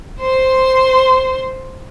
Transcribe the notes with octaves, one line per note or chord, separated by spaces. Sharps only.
C5 C6